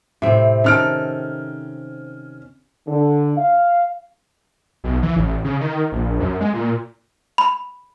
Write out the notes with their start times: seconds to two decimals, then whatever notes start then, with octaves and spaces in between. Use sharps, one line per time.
0.22 A2 C3 C4
0.64 D#3 C#4 A4 F6 D7
2.88 D3
3.36 F5
4.84 B1
5.03 E3
5.16 A1
5.44 C#3
5.61 D#3
5.92 A#1
6.20 F#2
6.40 G#3
6.53 A#2
7.38 B5